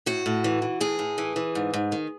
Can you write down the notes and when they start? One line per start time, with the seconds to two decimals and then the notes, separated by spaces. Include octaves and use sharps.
0.06 A2 F#4
0.26 A2
0.44 E3
0.62 E3
0.81 A2 G#4
0.99 A2
1.18 E3
1.36 E3
1.55 G#2
1.74 G#2
1.92 D#3